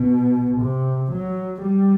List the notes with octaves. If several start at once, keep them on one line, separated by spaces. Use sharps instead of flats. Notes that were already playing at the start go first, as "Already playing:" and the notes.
Already playing: B2
C3
F#3
G3